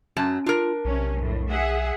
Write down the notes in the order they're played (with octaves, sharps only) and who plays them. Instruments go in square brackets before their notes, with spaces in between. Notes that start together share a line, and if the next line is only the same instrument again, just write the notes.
[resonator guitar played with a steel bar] F#2 F#3 A5 [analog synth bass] C#4
[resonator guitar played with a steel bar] D4 A#4 [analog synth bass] F4
[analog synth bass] B1 [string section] C3 C#4
[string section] F2 A2
G#4 E5 F#5